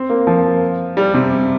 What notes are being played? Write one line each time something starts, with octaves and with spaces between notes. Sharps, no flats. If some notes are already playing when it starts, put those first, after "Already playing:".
Already playing: C4
A#3
F3
G3
C3